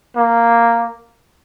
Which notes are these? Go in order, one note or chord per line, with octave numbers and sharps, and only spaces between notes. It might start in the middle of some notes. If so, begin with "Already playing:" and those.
A#3